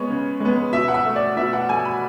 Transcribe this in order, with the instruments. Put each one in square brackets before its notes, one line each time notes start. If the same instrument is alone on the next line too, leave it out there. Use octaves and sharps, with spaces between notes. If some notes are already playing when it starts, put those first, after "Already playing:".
Already playing: [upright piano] G#3 B3 C#5
C#3
G#3
B3
B2 E5
F#5
E5
A3
D5
B2 E5
F#5
A3 G#5
B5